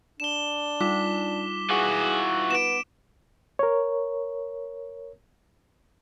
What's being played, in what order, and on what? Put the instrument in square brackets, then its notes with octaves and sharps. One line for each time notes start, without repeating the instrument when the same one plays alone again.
[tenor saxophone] D4 [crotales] E7 G7
[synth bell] G3 D#4 F4 [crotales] D6 B6
[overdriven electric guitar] E3 F#4 [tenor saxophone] G#4
[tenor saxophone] B3 [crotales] D7 E7
[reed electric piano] A#4 C#5